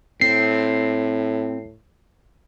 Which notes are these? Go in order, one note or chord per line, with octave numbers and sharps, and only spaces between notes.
A2 C4 C7